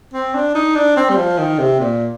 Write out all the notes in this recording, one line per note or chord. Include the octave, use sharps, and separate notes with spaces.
C4
D4
D#4
D4
C4
G3
F3
D#3
C3
A#2